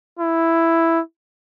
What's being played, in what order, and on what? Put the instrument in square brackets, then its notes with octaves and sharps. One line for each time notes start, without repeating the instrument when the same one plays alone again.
[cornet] E4